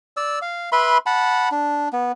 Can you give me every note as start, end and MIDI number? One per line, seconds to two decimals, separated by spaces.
0.17 0.39 74
0.17 0.39 88
0.42 0.70 77
0.72 0.98 71
0.72 0.98 76
0.72 0.98 83
0.72 0.98 84
1.06 1.49 78
1.06 1.49 81
1.06 1.49 83
1.51 1.89 62
1.93 2.12 59